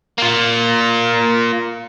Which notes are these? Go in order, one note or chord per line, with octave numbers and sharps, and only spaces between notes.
A#3 F4